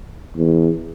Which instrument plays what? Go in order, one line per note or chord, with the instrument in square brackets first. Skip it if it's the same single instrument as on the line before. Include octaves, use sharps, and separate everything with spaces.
[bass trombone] E2